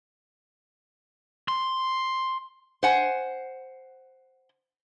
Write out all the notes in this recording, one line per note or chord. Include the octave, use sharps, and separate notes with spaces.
C6
C5 F#5 G#5